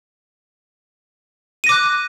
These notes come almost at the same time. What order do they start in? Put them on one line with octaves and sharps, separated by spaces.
D#7 A#6 D6 F#6